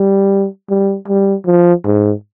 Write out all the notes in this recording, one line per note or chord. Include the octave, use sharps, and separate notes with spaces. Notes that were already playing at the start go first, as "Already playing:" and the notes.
Already playing: G3
G3
G3
F3
G#2